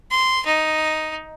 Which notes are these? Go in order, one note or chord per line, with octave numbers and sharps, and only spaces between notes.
C6
D#4